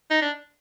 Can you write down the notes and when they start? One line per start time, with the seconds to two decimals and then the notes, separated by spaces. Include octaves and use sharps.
0.10 D#4
0.22 D4